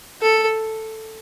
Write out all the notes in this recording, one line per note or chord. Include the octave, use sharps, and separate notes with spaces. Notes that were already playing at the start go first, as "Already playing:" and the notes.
A4